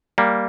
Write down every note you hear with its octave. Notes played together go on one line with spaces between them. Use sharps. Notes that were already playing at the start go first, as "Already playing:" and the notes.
G3 A#3